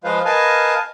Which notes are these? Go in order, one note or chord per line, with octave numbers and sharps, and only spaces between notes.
F3 G#3 F4 B4 C5 F5
A#4 B4 D#5 F5 G#5 A5